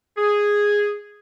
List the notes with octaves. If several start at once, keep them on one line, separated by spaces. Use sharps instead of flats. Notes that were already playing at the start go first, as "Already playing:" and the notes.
G#4